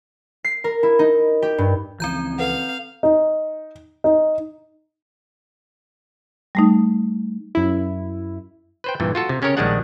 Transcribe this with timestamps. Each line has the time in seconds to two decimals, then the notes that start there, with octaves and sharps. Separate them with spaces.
0.44 C7
0.64 A#4
0.83 E4
0.99 D#4
1.42 G4
1.58 G2
2.00 C#2 E3 F3 C4 A#5 G6
2.39 A4 B4 F5 F#5
3.03 D#4
4.04 D#4
6.55 G3 A3 D#4
7.55 F#2 E4
8.84 B4 C5 G5
9.00 G2 A#2 E3
9.15 F4 F#4 A4
9.29 C3
9.42 C#3 C#4 G4 A#4 C#5
9.57 A#1 D#3 G3 G#3 D4 F#5